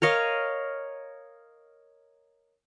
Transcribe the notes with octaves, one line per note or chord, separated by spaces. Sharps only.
A#4 C#5 D#5 F5